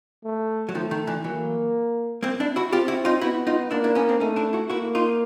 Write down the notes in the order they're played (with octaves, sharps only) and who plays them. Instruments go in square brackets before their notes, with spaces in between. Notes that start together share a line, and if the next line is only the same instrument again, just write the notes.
[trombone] A3
[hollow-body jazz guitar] F#3
[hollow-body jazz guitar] D#3 F3 [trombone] A3
[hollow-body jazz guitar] D#3
D3 E3
[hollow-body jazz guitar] E3 F#3 [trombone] A#3
[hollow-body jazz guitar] A#3 C4
D4 E4
E4 F#4
[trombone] C4 [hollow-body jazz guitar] F4 G4
[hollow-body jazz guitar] E4 F#4
D#4 F4
[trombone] B3 [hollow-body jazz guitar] E4 F#4
[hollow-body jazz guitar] D#4 F4
[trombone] A#3 [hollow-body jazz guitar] D4 E4
[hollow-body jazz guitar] D4 E4
B3 C#4
C4 D4
[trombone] A3 [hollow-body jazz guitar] C#4 D#4
[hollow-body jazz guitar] D4 E4
E4 F#4
[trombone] A#3 [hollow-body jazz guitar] E4 F#4
[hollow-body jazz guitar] D#4 F4